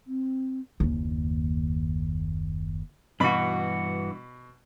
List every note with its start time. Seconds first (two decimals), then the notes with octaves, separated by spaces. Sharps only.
0.07 C4
0.80 F#1 D#2
3.20 G2 B2 E3 F#4 B5